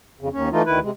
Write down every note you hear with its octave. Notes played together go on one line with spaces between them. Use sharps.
F2 C#3
D#2 C#4
E3 A3 D#4 F4
D2 D#3 E4 B4
C3 G#3